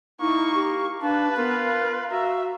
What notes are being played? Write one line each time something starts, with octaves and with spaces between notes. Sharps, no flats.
A#3 D#4 E4 C#6
G4
D4 B4 F5 A5
B3 F4 A#4
F5
F#4 E5 F5 A#5